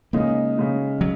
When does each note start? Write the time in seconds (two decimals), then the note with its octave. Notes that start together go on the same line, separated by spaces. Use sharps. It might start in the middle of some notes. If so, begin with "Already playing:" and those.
0.13 C#3 G#3 A#3 D#4
0.57 C#3 G#3 D#4
1.01 F#3